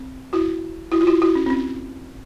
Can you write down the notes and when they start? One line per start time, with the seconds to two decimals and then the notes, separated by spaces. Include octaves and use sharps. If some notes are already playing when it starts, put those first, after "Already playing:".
Already playing: C4
0.33 E4 F#4
0.92 E4 F#4
1.01 F4
1.07 E4 F#4
1.22 E4 F#4
1.35 C#4
1.46 C4
1.50 C#4